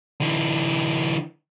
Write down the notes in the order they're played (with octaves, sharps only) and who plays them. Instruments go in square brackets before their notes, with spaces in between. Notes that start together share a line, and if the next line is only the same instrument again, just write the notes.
[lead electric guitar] D3 E3